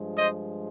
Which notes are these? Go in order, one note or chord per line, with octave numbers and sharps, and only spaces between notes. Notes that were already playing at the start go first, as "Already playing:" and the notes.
Already playing: G2 F3 G#3
C5 D#5